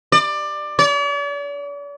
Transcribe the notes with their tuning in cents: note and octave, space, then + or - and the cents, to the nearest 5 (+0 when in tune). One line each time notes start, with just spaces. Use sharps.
D5 +20
D5 -45